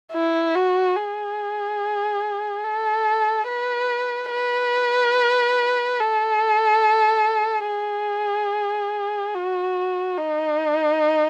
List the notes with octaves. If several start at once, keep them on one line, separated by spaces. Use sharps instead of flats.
E4
F#4
G#4
A4
B4
B4
A4
G#4
F#4
D#4